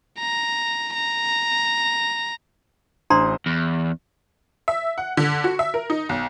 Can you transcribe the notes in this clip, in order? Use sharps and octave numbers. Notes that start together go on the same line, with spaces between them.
A#5
A#5
A1 D4 C5 A#5 C6 D#6
E2
E5
F#5
D3
F#4
E5
A#4
D#4
B1